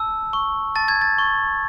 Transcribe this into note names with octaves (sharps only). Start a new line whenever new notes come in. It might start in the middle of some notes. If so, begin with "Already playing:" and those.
Already playing: A5 E6
C#6
A5 A6
G#6
A6
C#6